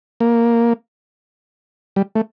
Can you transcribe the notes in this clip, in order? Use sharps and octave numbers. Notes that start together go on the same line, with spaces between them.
A#3
G3
A3